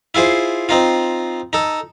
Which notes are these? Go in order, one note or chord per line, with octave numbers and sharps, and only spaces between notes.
E4 F4 G#4 C5
C4 D#4 F4
D#4 A4